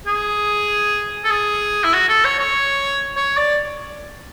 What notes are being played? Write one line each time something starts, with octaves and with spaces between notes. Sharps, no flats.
G#4
A4
G#4
E4
F#4
A4
C#5
C#5
C#5
D5